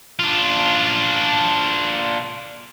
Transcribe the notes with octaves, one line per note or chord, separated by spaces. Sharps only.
D4 F4